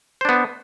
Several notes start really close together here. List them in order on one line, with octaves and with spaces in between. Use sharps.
C5 D4 B3